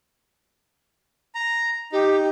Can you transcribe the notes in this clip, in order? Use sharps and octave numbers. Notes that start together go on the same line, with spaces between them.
A#5
D#4 G4